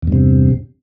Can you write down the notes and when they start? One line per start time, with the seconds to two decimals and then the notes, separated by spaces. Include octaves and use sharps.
0.02 E2
0.07 G2
0.12 C3